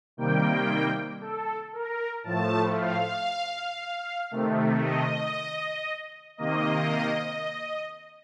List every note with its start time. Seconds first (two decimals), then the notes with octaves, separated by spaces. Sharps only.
0.17 C3 D#3 G3 A#3 G5
1.21 A4
1.73 A#4
2.24 A2 F3 A3 A5
2.76 F5
4.31 C3 D#3 A3
4.83 D#5
6.37 C3 D#3 A#3 D#5